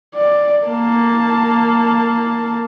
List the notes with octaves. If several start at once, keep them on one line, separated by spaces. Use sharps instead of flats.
D5
A#3 A5